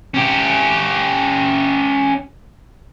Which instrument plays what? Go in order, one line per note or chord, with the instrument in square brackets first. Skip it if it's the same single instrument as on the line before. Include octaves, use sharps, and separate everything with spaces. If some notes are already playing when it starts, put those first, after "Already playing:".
[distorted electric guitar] C#4 G4